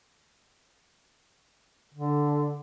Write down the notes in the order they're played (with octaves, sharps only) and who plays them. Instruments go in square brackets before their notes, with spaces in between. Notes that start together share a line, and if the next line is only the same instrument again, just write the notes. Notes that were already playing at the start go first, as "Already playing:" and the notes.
[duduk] D3